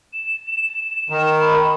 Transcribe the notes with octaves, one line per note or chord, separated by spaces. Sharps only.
E7
D#3
B5